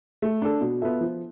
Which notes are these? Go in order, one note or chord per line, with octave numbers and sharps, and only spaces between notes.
A3
D4 A4
B2
B3 F4 A4 E5
F3